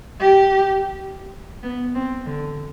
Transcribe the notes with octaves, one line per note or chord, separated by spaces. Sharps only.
G4
B3
C4
D3